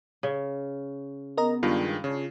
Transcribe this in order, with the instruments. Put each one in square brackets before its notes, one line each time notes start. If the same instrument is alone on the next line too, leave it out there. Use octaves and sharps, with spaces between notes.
[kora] C#3
[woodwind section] B3 [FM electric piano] A#4 D#5 A#5
[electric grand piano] G2 D#3 G#3 [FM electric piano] F4
[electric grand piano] C#3 [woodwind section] D4 C#5